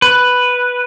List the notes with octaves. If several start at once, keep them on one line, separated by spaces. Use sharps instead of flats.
B4